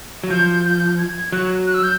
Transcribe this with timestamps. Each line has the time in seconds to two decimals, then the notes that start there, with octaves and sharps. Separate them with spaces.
0.24 F#3
0.30 F3 G6
0.65 G6
0.98 G#6
1.32 F#3 F#6
1.67 F#6
1.74 E6
1.83 G6